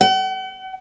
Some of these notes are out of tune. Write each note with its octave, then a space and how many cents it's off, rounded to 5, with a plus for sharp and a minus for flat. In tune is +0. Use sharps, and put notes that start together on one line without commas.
F#5 +45